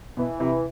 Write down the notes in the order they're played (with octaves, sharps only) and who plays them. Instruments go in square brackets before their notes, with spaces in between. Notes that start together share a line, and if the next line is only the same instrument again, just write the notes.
[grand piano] B2 [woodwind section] E3
[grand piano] C3 [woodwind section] E3